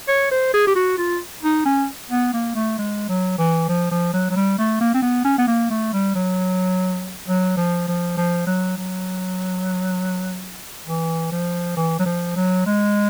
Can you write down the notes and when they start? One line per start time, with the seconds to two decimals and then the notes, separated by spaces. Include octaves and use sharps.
0.08 C#5
0.31 C5
0.54 G#4
0.67 G4
0.76 F#4
0.98 F4
1.43 D#4
1.65 C#4
2.10 B3
2.34 A#3
2.55 A3
2.78 G#3
3.09 F#3
3.38 E3
3.69 F3
3.91 F3
4.14 F#3
4.30 F#3
4.36 G3
4.58 A3
4.81 A#3
4.94 C4
5.02 B3
5.25 C#4
5.38 B3
5.48 A#3
5.70 A3
5.93 G3
6.15 F#3
7.28 F#3
7.57 F3
7.88 F3
8.17 F3
8.47 F#3
8.78 F#3
10.87 E3
11.32 F3
11.77 E3
12.00 F#3
12.06 F3
12.36 F#3
12.67 G#3